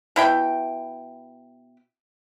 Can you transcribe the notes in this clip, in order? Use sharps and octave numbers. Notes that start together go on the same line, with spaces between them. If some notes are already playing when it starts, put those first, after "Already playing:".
B2 E4 G5